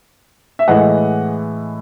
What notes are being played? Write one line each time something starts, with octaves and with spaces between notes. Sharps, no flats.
E5
A2 E3 G#3 D#5 F#5